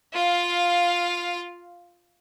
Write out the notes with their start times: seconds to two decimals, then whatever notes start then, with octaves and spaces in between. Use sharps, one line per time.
0.13 F4 F5